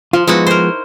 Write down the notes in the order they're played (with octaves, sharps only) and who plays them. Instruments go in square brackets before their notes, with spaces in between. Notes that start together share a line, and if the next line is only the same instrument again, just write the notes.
[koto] F3 [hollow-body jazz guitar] F4
[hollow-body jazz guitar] F3 G#3 B3 [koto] D#4 E4 F#4
[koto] A#4 C5